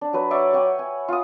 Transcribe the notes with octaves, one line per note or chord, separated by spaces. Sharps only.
D4
F#3 B4
C#5 D5 E5 F#5
C#5 F#5 G5
G#5
F4 D#6